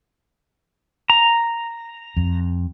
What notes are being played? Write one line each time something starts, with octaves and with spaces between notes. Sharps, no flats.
A#5
F2